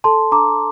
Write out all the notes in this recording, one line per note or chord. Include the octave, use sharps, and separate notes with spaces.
A4 A5 C6
D4 A#5 D6